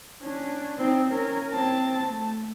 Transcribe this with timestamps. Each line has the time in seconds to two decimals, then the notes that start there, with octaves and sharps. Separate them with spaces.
0.22 C#4 D4
0.78 C4 D#4
1.11 C#4 A#4
1.52 C4 A5
2.07 A3